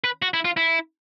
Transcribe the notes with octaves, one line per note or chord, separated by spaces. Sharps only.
B4
F#4
E4
F4
E4